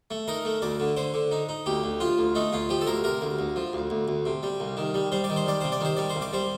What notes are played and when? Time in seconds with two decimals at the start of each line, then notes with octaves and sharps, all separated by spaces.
0.11 A3
0.28 D#4 A#4
0.45 A3
0.62 D2 D5
0.80 D3
0.97 D3 C5
1.14 D3
1.31 D#4
1.49 D#4
1.66 D2 G4
1.84 D2
2.00 F3 F4
2.18 D2
2.35 A3 D#4
2.53 D2 F4
2.69 F3 G4
2.81 A4
2.86 D2 A#4
3.04 C3 A#4
3.21 D2
3.39 D2
3.56 F3
3.73 D2
3.90 D2
4.08 D2
4.26 C3
4.43 G3
4.60 C2
4.77 D#3
4.94 G3
5.12 G3 C5
5.24 D5
5.29 D#3
5.36 C5
5.46 G3 D5
5.61 C3 C5
5.72 D5
5.81 D#3 C5
5.97 G3 D5
6.10 C5
6.16 C2
6.22 D5
6.33 G3 C5